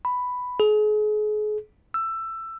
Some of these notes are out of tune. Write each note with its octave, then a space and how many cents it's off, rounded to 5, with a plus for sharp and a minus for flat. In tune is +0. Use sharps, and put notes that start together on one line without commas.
B5 +5
G#4 +35
E6 +15